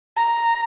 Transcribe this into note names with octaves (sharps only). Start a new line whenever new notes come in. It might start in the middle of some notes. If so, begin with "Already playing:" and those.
A#5